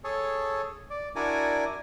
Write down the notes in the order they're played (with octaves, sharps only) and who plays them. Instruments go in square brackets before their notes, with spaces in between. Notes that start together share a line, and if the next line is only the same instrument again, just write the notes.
[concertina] G#4 A4 C#5 A5
D5
D4 E4 F#4 A#4 D5 G#5